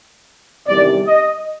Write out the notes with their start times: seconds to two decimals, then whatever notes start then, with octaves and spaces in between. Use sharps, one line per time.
0.67 E2 C3 D#3 G3 D5
1.06 D#5